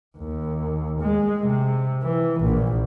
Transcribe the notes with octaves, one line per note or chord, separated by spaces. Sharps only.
D#2
G#3
C3
E3
A#1